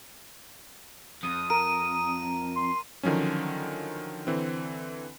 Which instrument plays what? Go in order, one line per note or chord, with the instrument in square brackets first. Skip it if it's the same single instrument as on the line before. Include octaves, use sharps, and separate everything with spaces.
[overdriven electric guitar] F2 [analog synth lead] D#6
[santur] A#4 [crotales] D#7
[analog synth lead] C6
[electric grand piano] D3 D#3 F3 F#3 C#4
D3 E3 C4